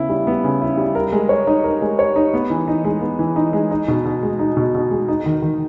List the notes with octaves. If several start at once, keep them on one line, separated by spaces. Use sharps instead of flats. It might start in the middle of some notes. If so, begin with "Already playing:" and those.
Already playing: C#3 B3 E4
G3
B3
C#3
E4
G3
A#4
G#3
C#5
D#4
A#4
G#3
C#5
D#4
B3
E3
D#4
G#3
B3
E3
D#4
G#3
D#4
B2
B2
G#3
D#4
B2
B2
G#3
D#4
D#3
D#3